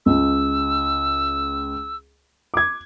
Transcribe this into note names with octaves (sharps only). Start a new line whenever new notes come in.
C#2 E6
D6 G#6